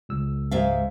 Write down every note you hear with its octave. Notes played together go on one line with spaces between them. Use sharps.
C#2 E6
G#2 E5 F5